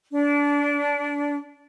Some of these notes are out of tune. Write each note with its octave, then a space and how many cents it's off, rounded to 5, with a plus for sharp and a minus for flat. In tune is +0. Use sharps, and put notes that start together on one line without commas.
D4 -25